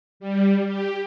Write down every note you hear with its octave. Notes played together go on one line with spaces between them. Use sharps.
G3
G4